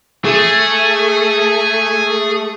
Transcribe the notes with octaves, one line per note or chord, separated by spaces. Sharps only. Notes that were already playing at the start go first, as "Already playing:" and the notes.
A3 G#4